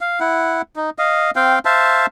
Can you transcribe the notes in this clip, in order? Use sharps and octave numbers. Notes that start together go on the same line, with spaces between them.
F5
E4 F#5
D#4
D#5 F5
C4 F5 G5
C5 E5 F5 A5